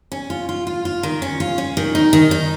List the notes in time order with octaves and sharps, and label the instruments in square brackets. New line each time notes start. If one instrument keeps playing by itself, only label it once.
[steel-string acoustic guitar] C#4
F4
F4
F4
F4
D#3
C#4
F4
C#4
D#3
D#4
D#3
D#4